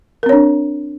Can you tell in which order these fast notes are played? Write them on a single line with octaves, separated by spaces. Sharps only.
A#4 C4 C#5 D4